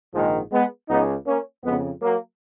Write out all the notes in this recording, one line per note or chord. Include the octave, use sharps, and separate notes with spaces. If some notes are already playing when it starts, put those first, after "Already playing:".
A#1 G#2 D#3 F3 G#3
G#3 B3
C#2 C#3 B3 D#4
A#3 C#4
F2 C#3 G#3 B3
F#3 A#3